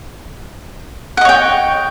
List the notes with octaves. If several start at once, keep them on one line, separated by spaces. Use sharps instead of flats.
C#5 D#5 F#5 G5